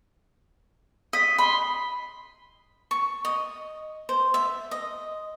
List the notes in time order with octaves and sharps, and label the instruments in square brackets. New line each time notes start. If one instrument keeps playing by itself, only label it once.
[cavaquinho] D#5 [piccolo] B6
[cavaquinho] B5 [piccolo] C6
[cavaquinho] C#6
D#5
C5
E5
D#5